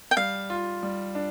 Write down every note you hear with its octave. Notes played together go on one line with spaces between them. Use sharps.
G5
G3 F5
F4
G3
D4